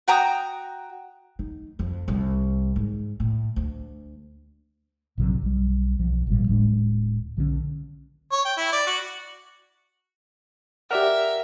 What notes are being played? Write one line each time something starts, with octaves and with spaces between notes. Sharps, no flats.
F#4 G5 A#5 D#6
D#4
F2
C2
G#2
A2
D2
A#1 G2 C3 F#3
B1 G3
B1 F3
G#1 A#2 E3 G3
D1 A2 G#3 D4
B1 D3 E3 C#4
C#5
G5
E4
D5
F#4
G4 A#4 D5 E5 F#5